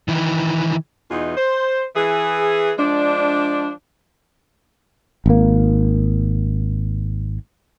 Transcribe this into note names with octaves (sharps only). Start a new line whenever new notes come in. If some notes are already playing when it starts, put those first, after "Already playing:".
D#3 E3
E2 B2 E3 D#4 F4
C5
E3 G#4
F3 G#3 D4
G#1 A#3